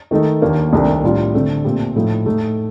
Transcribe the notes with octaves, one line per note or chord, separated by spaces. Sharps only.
D#3 A3 D#4 A4
D#2 D#3 A#3 D4
C2 C3 D#3 A3 D4
A2 G3 D4 F4
D3 A3 C4
A#2 A3 C4 G4
A2 F3 A3 D#4
A2 A3 D#4